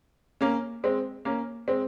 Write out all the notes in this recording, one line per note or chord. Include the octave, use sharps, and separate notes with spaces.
A#3 C#4
G#3 C4
A#3 C#4
G#3 C4